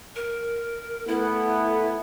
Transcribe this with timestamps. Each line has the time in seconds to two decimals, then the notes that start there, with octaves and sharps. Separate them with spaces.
0.16 A#4
1.07 A3 B3 E4